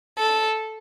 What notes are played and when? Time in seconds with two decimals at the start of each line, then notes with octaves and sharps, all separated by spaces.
0.18 A4